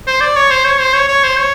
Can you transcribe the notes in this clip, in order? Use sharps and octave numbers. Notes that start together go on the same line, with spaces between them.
C5
D5
C#5
C5
C#5
C5
C#5
C#5
C5
C#5